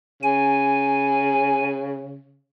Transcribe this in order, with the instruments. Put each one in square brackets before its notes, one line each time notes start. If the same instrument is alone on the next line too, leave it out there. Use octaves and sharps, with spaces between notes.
[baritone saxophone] C#3 [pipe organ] G#5